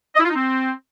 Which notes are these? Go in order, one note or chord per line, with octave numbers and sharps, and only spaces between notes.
D#5
E4
F4
D#4
C4